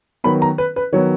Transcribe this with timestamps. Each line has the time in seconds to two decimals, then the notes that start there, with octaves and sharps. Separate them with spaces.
0.24 D#3 F#3 B3 B5
0.42 A#5
0.58 B4
0.76 B4
0.92 D#3 F#3 B3 C#5